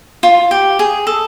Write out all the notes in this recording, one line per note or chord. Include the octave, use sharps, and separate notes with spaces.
F4
G4
G#4
A4